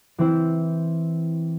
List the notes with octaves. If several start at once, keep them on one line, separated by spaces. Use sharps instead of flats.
E3 C4 E4